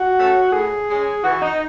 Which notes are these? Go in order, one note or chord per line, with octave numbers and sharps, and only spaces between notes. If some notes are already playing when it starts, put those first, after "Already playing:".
Already playing: F#4
A3 C#4
A2 G#4
G#3 C#4
E3 F#4
D#4